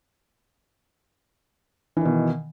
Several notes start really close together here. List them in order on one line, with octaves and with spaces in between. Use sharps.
E3 D#3 B2